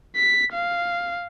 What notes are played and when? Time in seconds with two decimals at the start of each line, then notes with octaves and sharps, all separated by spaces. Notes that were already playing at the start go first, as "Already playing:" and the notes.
0.17 B6
0.53 F5